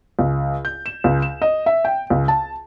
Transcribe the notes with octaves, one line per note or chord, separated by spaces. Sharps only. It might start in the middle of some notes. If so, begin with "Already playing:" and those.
C#2
G6
E7
C#2
E7
D#5
E5
G5
C#2
A5